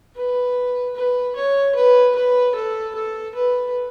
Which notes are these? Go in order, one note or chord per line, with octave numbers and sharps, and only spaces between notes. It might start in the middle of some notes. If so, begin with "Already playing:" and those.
B4
B4
C#5
B4
B4
A4
A4
B4